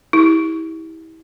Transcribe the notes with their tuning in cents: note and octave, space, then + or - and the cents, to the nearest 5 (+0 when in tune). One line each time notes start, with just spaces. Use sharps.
E4 -30 G4 +15